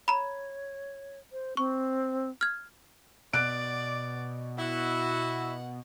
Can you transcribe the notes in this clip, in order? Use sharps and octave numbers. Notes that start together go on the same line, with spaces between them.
C#5 A#5 B5
C5
C4 C#6
F6 G#6
B2 D5 F#6 D7
E4 F#4 F#5